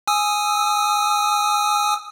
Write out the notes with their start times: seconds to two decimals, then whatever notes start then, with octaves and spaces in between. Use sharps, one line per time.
0.07 G#5 D#6 E6